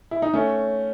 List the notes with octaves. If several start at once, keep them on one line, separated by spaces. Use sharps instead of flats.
E4
D#4
A3 C#4